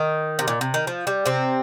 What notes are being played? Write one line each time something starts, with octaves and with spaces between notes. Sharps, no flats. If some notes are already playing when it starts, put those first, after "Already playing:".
Already playing: D#3
C3
A#2
C3
D#3
F3
G3
C3 C4